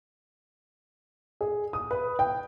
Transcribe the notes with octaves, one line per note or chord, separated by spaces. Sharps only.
G#4
D#6
B4
G5